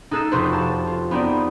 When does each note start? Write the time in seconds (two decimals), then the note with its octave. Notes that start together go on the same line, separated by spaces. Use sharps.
0.11 D#4 A4 F#6 A6 C7 E7
0.31 F1 F4 F#4 B4 C5 F#6
0.53 A5 A6
0.87 F4
1.11 B3 C4 D#4 D5